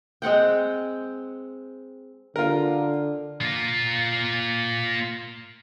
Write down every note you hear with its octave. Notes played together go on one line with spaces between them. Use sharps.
G#3 C4 F#5 G5
D3 F4 A#4
A#3 F4